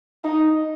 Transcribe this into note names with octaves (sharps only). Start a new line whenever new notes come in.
D#4